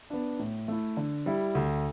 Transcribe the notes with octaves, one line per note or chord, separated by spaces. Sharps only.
B3 D4
A2
A3 E4
D3
G3 E4
D2